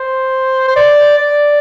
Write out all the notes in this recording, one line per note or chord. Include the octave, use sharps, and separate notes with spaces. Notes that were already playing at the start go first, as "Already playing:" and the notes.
Already playing: C5
C5
D5
D5